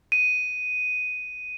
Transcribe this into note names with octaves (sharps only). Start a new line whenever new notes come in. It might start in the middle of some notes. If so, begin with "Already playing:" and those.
D#7